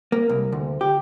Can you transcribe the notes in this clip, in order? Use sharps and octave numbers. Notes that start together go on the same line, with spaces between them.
A#3
C2
D2
G4